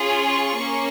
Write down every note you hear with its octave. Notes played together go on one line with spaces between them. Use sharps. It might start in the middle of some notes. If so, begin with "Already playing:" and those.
Already playing: C#4 F4 G#4
C#6
A#3 C#4